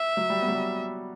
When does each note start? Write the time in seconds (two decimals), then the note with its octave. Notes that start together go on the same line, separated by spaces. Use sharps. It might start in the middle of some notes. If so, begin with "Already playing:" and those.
Already playing: E5
0.17 F#3
0.30 G3
0.42 B3
0.48 F#3
0.54 G3